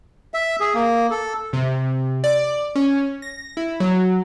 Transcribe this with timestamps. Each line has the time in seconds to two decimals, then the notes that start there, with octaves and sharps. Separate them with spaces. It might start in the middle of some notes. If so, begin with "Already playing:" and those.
0.34 E5
0.60 G#4
0.75 A#3
1.10 A4
1.53 C3
2.24 D5
2.75 C#4
3.22 A#6
3.57 E4
3.80 F#3